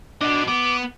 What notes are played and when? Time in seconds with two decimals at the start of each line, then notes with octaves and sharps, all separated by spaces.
0.21 D4 F#4 D#5
0.48 B3 D6